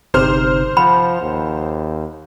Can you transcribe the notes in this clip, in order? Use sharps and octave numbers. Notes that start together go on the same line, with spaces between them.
G1 C3 D#4 C5 F6
F3 F#5 B5
D#2